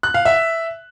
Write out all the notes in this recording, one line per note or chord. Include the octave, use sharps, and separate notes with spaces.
F#6
F5
E5